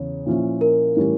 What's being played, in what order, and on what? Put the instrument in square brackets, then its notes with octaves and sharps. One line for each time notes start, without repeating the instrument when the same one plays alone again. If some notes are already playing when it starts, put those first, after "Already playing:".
Already playing: [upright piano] E2 C#3 [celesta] C#5
[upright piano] A#2 F3 C#4 E4
[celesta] A#4
[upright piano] A2 E3 G3 C#4 E4